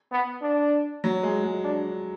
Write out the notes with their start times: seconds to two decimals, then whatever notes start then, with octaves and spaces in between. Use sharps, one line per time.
0.12 B3
0.42 D4
1.04 F#3
1.23 G#3
1.44 G#3
1.64 D4